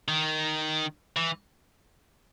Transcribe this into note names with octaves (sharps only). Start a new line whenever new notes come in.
D#3
E3